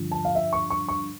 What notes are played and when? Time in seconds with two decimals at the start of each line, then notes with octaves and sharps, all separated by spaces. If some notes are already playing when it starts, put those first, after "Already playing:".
Already playing: G2 D3 F3
0.12 A5
0.25 F5
0.35 E5
0.53 C#6
0.70 C#6
0.88 C#6